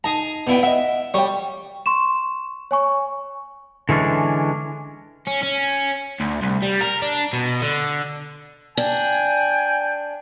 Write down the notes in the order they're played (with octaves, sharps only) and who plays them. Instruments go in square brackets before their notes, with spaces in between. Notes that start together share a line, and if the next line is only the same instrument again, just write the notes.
[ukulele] D#4 A5 [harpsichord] G#4 A#5
[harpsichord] B2 E4 G5 [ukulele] D5 F#5
[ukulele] D#5 F#5 [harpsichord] E5
[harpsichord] G3 [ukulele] C#5 G5
[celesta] C6 C#6 E7
C#5 G#5 C#6
[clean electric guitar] D3 E3 G#3 C#4 D4
[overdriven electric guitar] C#4
C#4
D2
C2
G3
A#4
D4
B2
D3
[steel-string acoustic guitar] D4 [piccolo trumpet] G5 [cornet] G#5